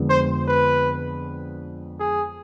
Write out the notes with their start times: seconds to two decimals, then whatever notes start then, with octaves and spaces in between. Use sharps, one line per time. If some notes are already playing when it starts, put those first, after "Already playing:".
Already playing: F2 D3 G#3 B3
0.10 C5
0.48 B4
2.00 G#4